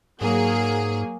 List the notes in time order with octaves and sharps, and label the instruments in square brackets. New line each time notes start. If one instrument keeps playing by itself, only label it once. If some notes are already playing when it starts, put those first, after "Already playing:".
[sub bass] G#2 [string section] F#3 A#3 G#4